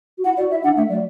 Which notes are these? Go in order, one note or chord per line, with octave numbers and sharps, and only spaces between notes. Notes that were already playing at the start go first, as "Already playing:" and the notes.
F#4
E4 F#5
F#4 D5
E4 E5
D4 F#5
A3 E5
F#3 D5